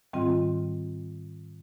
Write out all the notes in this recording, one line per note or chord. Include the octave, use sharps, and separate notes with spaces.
G#2 D#3 G3 C4 F4